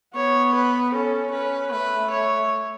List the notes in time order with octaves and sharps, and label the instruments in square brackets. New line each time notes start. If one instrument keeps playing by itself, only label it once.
[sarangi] B3 [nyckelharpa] C#5
[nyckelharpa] B4
[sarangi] C#4 [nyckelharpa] A4
[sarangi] C#4 [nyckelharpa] B4
[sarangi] A3 [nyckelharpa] B4
[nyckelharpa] C#5